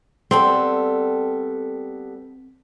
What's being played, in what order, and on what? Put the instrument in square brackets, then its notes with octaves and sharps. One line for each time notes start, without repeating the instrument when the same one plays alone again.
[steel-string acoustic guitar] G3 B3 A4 [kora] C4